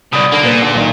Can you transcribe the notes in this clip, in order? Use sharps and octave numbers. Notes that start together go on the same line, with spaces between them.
C2 B2 D5 B5 D#6
D3 A#3
A#2 A#3 B4
D3
B1 D#3